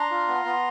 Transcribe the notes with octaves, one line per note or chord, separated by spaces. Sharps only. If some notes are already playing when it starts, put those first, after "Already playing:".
Already playing: D4 A#5 C6
F4
B3
B3